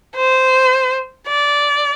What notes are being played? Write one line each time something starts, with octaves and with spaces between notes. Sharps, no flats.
C5
D5